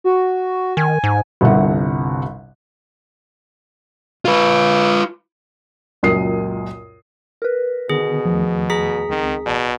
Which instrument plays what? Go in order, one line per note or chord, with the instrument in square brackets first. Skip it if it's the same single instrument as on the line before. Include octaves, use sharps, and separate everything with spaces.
[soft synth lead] F#4
[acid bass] D#3 [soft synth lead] G#5
[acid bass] G#2
[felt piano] G1 C2 C3 F#5
[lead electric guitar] F4 B4
[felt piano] C#2 F#2 A#2 D#6 C7
[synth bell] A#4 B4
[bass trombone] B2 [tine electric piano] D3 D#3 B3 [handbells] G#4
[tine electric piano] E2 D#3 A3 [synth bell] F3
[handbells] G#4 B6 [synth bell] A#5
[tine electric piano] C#2 C4 [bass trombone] D#3
[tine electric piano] A1 D5 A5 [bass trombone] B2